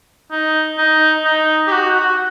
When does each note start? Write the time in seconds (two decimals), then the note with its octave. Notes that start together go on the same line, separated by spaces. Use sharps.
0.31 D#4
0.78 D#4
1.25 D#4
1.67 G4
1.72 F#4
1.96 F#4